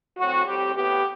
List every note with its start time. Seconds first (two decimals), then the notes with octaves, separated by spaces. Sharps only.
0.18 A2 F#3 C4 F#4
0.46 A2 G3 C4 G4
0.74 A2 E3 B3 G4